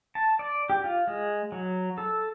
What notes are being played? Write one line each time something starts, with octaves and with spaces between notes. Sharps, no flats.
A5
D5
G4
F4
G#3
F#3
A4